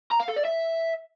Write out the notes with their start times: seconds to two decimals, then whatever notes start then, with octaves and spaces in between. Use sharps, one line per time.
0.12 A#5
0.20 F5
0.28 A4
0.37 D5
0.45 E5